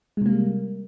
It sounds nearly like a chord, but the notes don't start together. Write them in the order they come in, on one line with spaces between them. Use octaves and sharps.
G#3 C3 A#3 G3